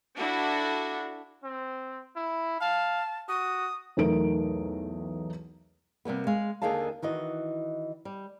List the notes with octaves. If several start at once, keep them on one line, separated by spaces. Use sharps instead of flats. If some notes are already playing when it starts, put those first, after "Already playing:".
D4 E4 F#4 A4
C4
E4
F5 A5
F#4 D#6
B1 E2 A3 D#4 A#4 D7
C3 G3 A#3 B3
G#3 G#4 F5
D#2 D3 D#3 G#4 F5 A5
D#3 E3 F#4 D#5
G3